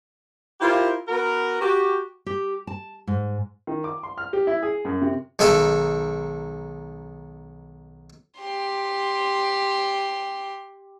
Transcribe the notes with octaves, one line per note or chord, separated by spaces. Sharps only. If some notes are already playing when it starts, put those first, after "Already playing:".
E4 F4 G4 A#4 C5
B3 F#4 A#4
F#4 G4
G4
A5
G#2
D#3
D6
C6
F6
G4
E4
G#4
F#2
C3
B1 D#3 G#3 A4 G#5
G4 C6